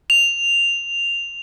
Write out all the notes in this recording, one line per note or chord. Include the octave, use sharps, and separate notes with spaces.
F7